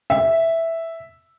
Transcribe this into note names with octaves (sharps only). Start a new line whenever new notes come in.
E5